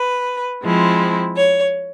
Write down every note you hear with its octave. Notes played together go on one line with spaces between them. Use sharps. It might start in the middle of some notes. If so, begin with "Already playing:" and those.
Already playing: B4
F3 G#3 C4 E4
C#5